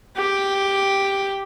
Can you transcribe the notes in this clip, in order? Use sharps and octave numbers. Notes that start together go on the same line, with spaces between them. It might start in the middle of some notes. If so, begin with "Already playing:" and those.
G4 G5